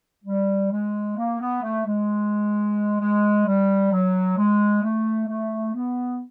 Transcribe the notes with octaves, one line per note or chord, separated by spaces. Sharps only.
G3
G#3
A#3
B3
A3
G#3
G#3
G3
F#3
G#3
A3
A3
B3